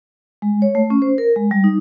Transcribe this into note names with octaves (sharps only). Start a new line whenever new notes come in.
G#3
C#5
A3
C#4
C5
A#4
G#3
G3
D#4